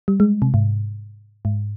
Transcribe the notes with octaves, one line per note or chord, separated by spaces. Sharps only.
G3
G#3
C3
G#2
G#2